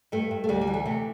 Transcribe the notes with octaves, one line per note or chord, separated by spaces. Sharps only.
G2 A3
G2
A3
D2 G3
G3
E3
A3
C3 A3